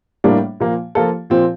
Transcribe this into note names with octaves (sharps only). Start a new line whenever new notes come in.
A2 G3 A#3 D4
A#2 F3 A#3
F3 A#3 F4 A4
A#2 F3 C4